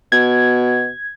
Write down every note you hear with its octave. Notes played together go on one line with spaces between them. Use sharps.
B2 G#6